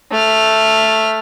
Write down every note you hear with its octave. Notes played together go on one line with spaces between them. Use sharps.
A3 F6